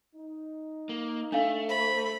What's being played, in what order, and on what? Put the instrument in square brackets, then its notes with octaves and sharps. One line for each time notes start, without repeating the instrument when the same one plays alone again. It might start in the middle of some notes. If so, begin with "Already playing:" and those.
[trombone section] D#4
[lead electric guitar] A#3
[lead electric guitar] A3 [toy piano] D4 F5
[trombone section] C5 [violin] B5